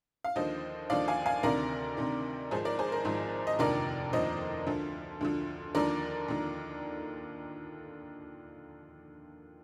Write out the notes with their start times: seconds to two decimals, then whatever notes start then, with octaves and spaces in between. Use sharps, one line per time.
0.24 F5
0.36 D#2 D3 F3 C5 D#5
0.90 D#2 D3 F3 D5 F5
1.08 F5 G#5
1.26 F5 G#5
1.43 D2 C3 D#3 A#4 D5
1.97 D2 C3 D#3
2.51 G#1 G#2 F3 G#4 C5
2.65 A#4 D5
2.79 G#4 C5
2.92 A#4
3.05 G#1 G#2 F3
3.47 D#5
3.59 F1 D#2 D3 F3 A#4 D5
4.13 F1 D#2 D3 F3 C5 D#5
4.67 D2 D3 F3
5.21 D2 D3 F3
5.75 D#2 D3 F3 A#4 D5
6.28 D#2 D3 F3